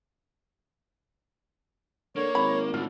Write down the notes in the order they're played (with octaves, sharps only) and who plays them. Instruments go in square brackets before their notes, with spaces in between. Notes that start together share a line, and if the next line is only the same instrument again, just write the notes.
[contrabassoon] D3 [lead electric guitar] A#3 [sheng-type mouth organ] C#5
[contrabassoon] G#1 [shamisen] B5
[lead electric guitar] A2 D3 [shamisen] F4